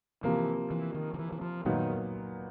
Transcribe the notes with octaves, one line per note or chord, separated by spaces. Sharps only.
C3 E3 F3 A#3
E3
D#3
D#3
E3
E3
F3
A#2 D#3 F#3 B3 D#4